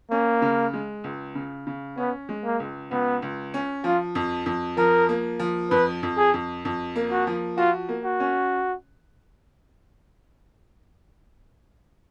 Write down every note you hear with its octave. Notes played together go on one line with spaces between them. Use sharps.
A#3 C#4
C#3
G#3
C#2
C#3
C#3
B3 C#4
G#3
A#3
C#2
C#2 B3
C#2
C#4
F3 F4
F2
F2
F3 A#4
A#3
F3
F2 B4
F2
G#4
F2
F2
A#3
F#4
F3
F4 F#4
A#3
F#4
C#4